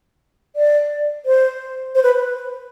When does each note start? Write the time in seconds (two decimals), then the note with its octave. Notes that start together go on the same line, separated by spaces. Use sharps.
0.56 D5
1.26 C5
1.95 C5
2.03 B4